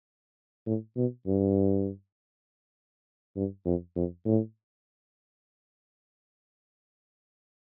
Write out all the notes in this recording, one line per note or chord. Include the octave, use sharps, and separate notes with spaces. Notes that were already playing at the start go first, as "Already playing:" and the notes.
A2
B2
G2
G2
F2
F2
A2